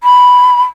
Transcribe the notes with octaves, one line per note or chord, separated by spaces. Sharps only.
B5